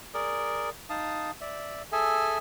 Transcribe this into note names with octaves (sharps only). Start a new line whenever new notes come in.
G#4 A#4 D5
D#4 F5 A5 D#6
D5 E5
G#4 A4 E5 G#5